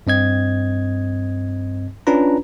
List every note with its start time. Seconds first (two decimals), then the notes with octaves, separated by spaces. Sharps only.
0.07 G2 C4 D#5 G#6
2.07 C#4 D4 F4 B4 A#5